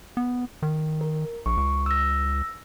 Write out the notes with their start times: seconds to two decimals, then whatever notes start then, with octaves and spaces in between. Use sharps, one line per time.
0.17 B3
0.62 D#3
1.01 A#4
1.46 A#1 C#6
1.57 C#2
1.86 E6 A#6